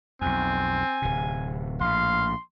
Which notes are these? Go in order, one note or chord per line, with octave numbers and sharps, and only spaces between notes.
B1 F2 C4 G#5
D1 C3
A#1 A2 F5 C6